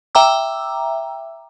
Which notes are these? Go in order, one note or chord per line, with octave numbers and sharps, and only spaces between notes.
E5 G5 A#5 D6 E6